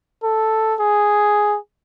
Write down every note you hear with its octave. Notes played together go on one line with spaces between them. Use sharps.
A4
G#4